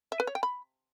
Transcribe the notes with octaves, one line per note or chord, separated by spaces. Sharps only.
E5
B4
C#5
G5
B5